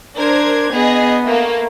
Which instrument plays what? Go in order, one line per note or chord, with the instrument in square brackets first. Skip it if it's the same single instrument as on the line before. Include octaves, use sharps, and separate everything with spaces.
[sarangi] D4 [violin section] A#4 C5 G#6
[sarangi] B3 [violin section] G#4 D#5
[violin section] A3 A#3